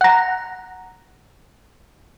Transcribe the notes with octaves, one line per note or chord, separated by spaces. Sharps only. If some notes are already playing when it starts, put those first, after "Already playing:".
F#5 A#5